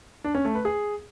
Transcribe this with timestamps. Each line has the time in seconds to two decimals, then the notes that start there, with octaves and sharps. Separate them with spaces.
0.24 D4
0.35 C#4
0.45 A3
0.55 B4
0.65 G#4